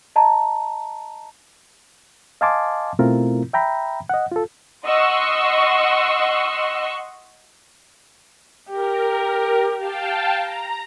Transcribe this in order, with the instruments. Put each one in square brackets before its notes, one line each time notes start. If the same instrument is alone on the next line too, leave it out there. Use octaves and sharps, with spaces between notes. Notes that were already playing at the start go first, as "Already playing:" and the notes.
[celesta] D#5 A5 A#5
[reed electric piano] D#5 F5 G#5 A5 C6 D6
B2 A3 C4 E4 F4 A#4
E5 G5 A#5 B5
D#5 F#5
F4 A4
[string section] D#5 F#5 C6 C#6 E6
[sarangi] G4 [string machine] A#4
[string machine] F5 G5 A5
A#5